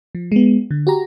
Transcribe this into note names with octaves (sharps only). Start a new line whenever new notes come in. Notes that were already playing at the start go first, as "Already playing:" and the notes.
F3
G#3 B3
D3
F#4 G4 A#5